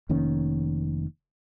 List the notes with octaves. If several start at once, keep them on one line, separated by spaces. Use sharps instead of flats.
F1 D#3 A#3 C#4